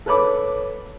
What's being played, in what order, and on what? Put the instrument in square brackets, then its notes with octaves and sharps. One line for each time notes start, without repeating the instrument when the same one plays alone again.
[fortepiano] A4 B4 C#5 B5 D6